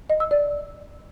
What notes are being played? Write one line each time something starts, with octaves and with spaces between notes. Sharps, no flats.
D#5
E6
D5